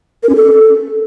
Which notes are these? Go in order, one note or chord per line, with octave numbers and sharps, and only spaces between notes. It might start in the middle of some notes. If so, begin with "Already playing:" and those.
A#4
C#4
A4